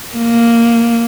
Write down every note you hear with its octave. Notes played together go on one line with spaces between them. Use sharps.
A#3